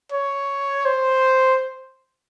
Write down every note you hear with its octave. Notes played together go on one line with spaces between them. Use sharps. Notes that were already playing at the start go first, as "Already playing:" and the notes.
C#5
C5